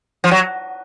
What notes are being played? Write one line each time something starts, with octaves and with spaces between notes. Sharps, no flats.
F3
F#3